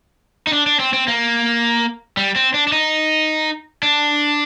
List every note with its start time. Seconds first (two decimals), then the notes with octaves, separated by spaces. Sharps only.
0.47 D#4
0.53 D4
0.67 D4
0.80 C4
0.93 C4
1.08 A#3
2.17 G3
2.36 C4
2.54 D4
2.67 D4
2.72 D#4
3.83 D4